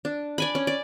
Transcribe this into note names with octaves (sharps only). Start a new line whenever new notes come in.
D4
D5 G#5 B5
C#4
D5